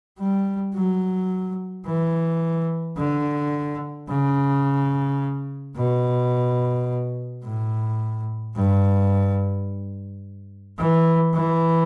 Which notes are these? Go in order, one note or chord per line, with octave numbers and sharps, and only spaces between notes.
G3
F#3
E3
D3
C#3
B2
A2
G2
E3
E3